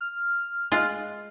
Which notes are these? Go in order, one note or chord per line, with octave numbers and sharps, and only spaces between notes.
F6
G#3 F4